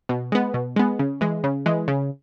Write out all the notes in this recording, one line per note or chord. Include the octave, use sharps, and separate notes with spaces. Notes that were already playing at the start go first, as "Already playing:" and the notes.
B2
G#3 B3
B2
G#3 B3
C#3
E3 G#3
C#3
E3 G#3
C#3